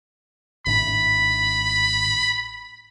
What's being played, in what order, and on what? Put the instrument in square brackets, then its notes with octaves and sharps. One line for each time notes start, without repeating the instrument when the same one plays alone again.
[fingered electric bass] G#1 A2 D4 [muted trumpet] B5